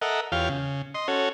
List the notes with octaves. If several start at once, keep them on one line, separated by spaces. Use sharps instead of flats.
A4 A#4 D#5 E5 F#5
E2 F4 G4 C#5 F5
C#3
D#5 C6
C#4 F#4 A4 C#5